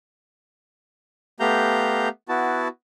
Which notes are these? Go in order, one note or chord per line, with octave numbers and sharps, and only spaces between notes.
A3 B3 G4 F5 A#5 G6
B3 E4 F#4 A5